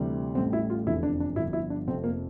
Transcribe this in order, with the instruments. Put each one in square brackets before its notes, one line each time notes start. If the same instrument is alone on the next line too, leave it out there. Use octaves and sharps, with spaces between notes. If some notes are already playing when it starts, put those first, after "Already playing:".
Already playing: [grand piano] D2 C3 E3 G3
A1 A2 G3 C4
E4
F4
F1 E2 D3 F3 E4
D4
D4
G1 G2 F3 E4
E4
D4
F1 F2 C3 F3 C4
A#3